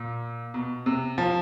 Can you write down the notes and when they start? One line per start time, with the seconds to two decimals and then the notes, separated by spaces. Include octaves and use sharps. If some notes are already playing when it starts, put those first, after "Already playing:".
Already playing: A#2
0.54 B2
0.86 C3
1.18 F3